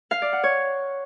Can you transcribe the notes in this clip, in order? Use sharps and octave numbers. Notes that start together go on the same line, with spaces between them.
F5
D5
F#5
C#5